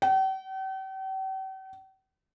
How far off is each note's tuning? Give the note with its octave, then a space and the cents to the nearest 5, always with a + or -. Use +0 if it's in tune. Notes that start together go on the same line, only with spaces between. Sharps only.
G5 -45